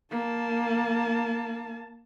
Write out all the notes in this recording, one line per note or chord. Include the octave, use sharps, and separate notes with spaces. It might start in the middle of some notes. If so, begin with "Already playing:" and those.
A#3 A5